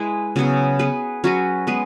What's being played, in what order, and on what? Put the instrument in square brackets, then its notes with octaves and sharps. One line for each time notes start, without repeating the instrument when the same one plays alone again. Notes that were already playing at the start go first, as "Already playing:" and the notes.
Already playing: [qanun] G#3 E4 B4
C#3 F#3 B3 G#4
B3 G#4 B4
F#3 C#4 F#4 B4
G#3 B3 G#4 B4